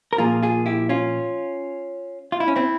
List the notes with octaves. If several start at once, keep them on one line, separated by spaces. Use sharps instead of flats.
A#4
A#2 F3 A#3 F4 G#4
F4 G#4
E4 G4
C#4 F4
F4
E4
C#4
C4 E4